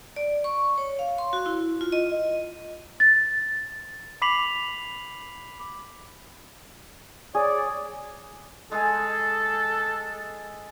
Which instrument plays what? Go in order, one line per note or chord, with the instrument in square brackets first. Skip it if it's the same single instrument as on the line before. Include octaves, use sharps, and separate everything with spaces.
[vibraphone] D5
C#6
C#5
F5
C6
F#4
E4
F4
D#5
[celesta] A6
[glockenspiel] B5 D6 B6 C7 F7 F#7
[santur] G#4 [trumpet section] C#5 D5
[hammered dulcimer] G#3 G#4 G#5 [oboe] A4